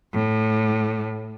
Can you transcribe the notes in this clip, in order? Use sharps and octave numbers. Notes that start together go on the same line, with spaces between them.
A2